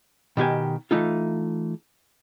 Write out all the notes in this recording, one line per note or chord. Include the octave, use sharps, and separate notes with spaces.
B2 D#3 G4 G#5
E3 A3 D#4 F4